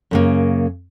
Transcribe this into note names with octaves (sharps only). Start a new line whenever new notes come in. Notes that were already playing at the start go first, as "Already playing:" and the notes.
F#2 C#3 A#3